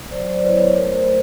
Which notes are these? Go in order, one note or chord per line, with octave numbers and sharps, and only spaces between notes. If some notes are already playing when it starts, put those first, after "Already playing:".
F#3 C5 D5
D5
B3 E4 B4 C#5
A3 A#4 C5